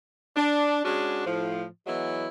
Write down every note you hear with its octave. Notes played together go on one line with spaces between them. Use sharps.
D4
G#3 C#4 D4 F#4
A2 F3
E3 F#3 G#3 B3 E4